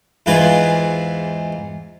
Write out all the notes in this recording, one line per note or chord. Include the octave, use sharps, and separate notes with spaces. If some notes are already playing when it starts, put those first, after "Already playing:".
E2 G#2 E3 E4 F4 G#5